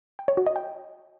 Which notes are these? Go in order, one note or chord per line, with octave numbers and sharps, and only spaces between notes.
G5
C#5
F#4
D#5
G5